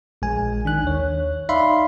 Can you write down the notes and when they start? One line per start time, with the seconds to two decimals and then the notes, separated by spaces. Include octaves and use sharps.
0.22 A#1 G#3 G#5
0.65 D#3 D4 F#6
0.83 D#2 C#5
1.49 D#4 D5 E5 F5 B5 C6